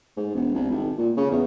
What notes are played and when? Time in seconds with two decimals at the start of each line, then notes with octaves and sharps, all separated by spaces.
0.17 G#2
0.34 E1
0.54 C2
0.71 G#1
0.98 A#2
1.17 C#3
1.31 E2